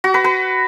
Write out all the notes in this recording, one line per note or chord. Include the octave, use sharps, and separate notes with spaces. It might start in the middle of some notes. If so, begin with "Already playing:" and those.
F#4
B4
B4